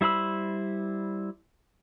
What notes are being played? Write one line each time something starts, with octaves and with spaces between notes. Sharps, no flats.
G3 E4 C5 B5 E6